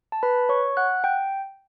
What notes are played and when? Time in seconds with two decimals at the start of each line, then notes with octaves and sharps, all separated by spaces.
0.12 A5
0.23 B4 B5
0.49 C#5 C#6
0.77 F#5 F#6
1.04 G5 G6